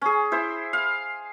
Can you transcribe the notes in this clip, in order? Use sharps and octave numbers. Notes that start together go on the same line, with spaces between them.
C#4 G#4
E4 C5
F5